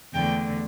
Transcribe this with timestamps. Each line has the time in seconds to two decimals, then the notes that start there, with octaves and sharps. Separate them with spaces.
0.13 E2 D3 A3 G5